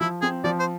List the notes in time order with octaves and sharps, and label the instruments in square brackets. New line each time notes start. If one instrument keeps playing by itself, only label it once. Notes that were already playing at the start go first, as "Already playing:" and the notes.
[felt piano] F3 [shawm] E4
[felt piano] C4 [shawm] G#4
[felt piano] F3 [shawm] D5
[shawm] C5